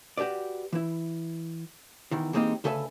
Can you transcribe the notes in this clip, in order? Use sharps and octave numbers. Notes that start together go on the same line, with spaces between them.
F#4 G4 A4 B4 D5
E3 E4
E2 D#3 E3
E3 G#3 A#3 C4 D#4 G4
D2 C#3 A4 B4 E5 G#5